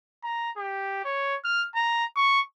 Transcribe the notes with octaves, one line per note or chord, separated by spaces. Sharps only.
A#5
G4
C#5
F6
A#5
C#6